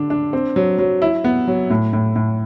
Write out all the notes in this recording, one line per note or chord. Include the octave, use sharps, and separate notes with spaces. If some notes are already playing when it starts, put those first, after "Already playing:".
Already playing: D3 D4
D4
C4
F#3
F#3
E4
B3
F#3
A2
A2
A2